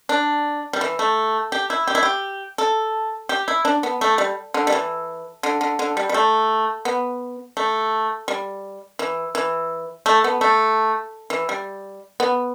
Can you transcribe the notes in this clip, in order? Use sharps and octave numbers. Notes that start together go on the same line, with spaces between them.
D4
G3
E3
A3
G4
E4
G4
E4
G4
A4
G4
E4
D4
B3
A3
G3
D3
G3
E3
D3
D3
D3
G3
G3
A3
B3
A3
G3
E3
E3
A3
B3
A3
E3
G3
B3